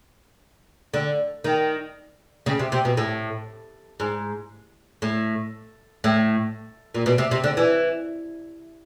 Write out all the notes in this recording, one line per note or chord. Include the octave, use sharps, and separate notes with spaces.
D3
D#3
C#3
C3
C3
B2
A2
G#2
A2
A2
A#2
B2
C3
C3
D3
E3